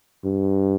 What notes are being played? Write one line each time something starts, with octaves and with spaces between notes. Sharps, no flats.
G2